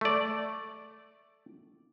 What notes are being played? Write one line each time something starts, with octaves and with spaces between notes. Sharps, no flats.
A3 D5